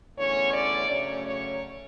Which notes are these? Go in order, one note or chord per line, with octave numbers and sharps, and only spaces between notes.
E2 D3 A3 C#4 C#5
D5
C#3 F#3 A3 C#4 C#5
C#5